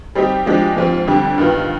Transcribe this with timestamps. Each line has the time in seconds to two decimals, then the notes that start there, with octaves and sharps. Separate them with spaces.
0.15 G3 C4 D#4 G4
0.46 F3 G#3 D4 G4
0.77 G#2 F3 C4
1.07 F2 D3 G3
1.38 G2 D#3 B3 F4